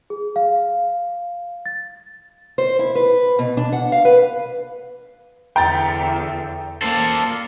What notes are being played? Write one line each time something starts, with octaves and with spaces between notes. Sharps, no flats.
G#4
F5
A6
C5
E4
B4
B2
D4
F#5
F5
B4
E2 D3 G5 A#5 A6
A#3 A4 C5 D5